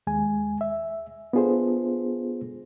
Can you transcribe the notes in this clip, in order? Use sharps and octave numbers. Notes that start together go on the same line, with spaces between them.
D#2 G#3 G#5
E5
B3 D4 F4 G#4 A4 C5